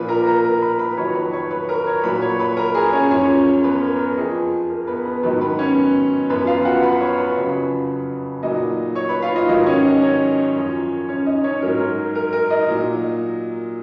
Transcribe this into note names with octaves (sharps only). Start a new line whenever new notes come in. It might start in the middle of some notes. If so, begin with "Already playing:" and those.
Already playing: A#2 F3 B4 B5
A#4 A#5
A#4 A#5
A#4 A#5
B4 B5
B4 B5
F2 D#3 F#3 C#5 C#6
B4 B5
C#5 C#6
B4 B5
A#4 A#5
C#5 C#6
A#2 F#3 B4 B5
C#5 C#6
B4 B5
A#4 A#5
G#4 G#5
C#4 C#5
F#2 F3 C#4 C#5
B3 B4
A#4
A#4
F2 F3 G#4
A#4
B3 B4
B3 B4
G#2 D#3 F#3 B3 B4
B3 B4
C#4 C#5
F#2 F3 B3 B4
F4 F5
F#4 F#5
B4 B5
C#5 C#6
B4 B5
F2 C#3 F#3
A#2 F#3 D#4 D#5
C#5 C#6
B4 B5
F4 F5
D#4 D#5
G#2 D#3 F#3 D#4 D#5
C#4 C#5
D#4 D#5
C#4 C#5
F#2 F3
C#4 C#5
D#4 D#5
C#4 C#5
G#2 F#3 A#4
A#4
A#4
A#4
D#4 D#5
A#2 F#3